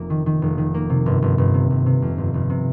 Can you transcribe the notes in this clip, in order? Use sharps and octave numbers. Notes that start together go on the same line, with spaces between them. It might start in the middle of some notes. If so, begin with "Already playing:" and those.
Already playing: F1 A#3
D#3
D#3
F1
D#3
A#3
C3
G1
G1
G1
C3
G1
C3
F2
G1
G1
C3